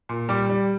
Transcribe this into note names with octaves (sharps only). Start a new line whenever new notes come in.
A#2
G3 D6
G3